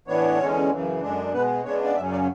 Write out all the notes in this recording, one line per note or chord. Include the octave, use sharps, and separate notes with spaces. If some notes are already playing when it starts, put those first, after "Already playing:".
A2 E3 B3 D4 C#5
E2 D3 G#3 C#4
F#2 C#3 E3
F#2 D3 G#3 D4
B2 G#3 B3 B4
C#3 G#3 B3 D4 C#5
D5
F#2 C#3 F#3 C#4 E5
D5